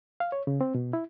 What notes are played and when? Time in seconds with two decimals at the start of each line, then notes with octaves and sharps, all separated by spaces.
0.20 F5
0.32 C#5
0.47 C#3
0.61 C4
0.75 B2
0.93 E4